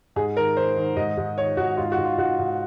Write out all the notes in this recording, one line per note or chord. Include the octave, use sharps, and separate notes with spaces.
G#2 G#4
D#3 A#4
D#3 C5
D#3
G#2 D#5
G#2
D#3 C#5
G#2 F#4
G#2 F4
F#4
G#2
F4
G#2 F#4
G#2